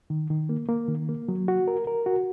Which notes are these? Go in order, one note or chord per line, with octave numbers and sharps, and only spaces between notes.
D#3
D#3
A#3
A#3
D#3
A#3
F#3
F#4
A#4
A#4
F#4